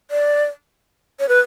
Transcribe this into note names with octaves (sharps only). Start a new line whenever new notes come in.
D5
C#5
B4